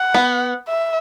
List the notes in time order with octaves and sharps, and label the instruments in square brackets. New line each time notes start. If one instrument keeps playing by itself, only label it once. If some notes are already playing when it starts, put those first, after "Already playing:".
Already playing: [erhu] F#5
[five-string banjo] B3
[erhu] E5